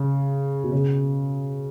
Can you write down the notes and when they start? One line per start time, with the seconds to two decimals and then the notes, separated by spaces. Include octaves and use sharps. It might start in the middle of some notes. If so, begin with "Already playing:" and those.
Already playing: C#3
0.64 B2
0.72 C#3